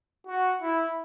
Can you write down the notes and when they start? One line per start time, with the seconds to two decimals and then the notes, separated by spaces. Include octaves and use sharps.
0.27 F#4
0.62 E4